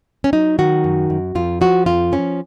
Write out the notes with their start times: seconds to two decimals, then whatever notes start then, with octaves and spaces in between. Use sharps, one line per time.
0.24 C#4
0.33 F#3 D#4
0.59 D#3 F#4
0.84 F#2
1.10 F#2
1.35 F2 F4
1.61 F3 F#4
1.86 F2 F4
2.12 F3 C#4